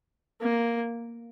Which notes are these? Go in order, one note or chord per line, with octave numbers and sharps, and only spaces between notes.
A#3